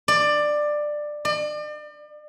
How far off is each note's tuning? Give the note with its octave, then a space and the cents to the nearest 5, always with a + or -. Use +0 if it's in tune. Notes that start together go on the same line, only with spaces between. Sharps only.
D5 +15
D5 +40